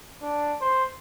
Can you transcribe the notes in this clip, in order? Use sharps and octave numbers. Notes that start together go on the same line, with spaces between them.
D4
C5